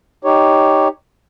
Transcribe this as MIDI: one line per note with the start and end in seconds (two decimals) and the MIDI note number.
0.25 0.88 63
0.25 0.88 67
0.25 0.88 73